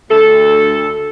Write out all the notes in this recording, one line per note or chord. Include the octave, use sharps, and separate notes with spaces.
D2 A4